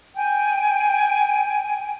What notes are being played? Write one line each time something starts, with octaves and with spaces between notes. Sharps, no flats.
G5 G#5